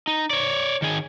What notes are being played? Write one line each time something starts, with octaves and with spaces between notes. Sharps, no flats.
D#4
C#5 D5
D#3 G#4